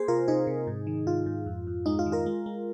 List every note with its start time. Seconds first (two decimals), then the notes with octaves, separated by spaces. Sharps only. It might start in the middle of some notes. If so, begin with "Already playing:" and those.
Already playing: A#3 G#4 C5
0.08 C3 F4 A#4
0.28 C3 D#4 G#4
0.47 C3
0.67 G#2
0.87 D#3
1.07 G#2 F4
1.26 G#2
1.46 F2
1.67 F2
1.86 G#3 D#4
1.99 F4
2.06 D#3
2.12 F4 A#4
2.26 G#3
2.46 G#3